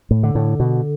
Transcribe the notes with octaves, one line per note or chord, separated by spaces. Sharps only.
A2
D3
A2
B2